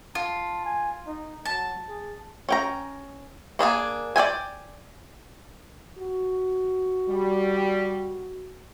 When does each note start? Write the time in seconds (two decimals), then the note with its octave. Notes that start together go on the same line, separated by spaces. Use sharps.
0.15 F4 A5
0.65 G#5
1.07 D#4
1.46 F#3 A5
1.89 G#4
2.49 C#4 G5 A#5
3.59 A#3 D4 G#4 G#5
4.16 D5 E5 G5 G#5
5.98 F#4
7.08 G3